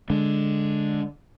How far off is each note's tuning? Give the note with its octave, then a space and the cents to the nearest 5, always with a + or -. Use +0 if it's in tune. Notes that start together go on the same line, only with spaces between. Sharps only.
D3 +0 G#3 +0 D4 +0